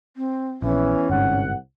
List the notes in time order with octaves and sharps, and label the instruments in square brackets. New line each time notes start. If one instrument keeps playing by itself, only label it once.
[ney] C4
[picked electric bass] A#1 [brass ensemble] E2 E3 [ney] C#4
[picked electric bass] G1 G#2 [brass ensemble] C2 F#5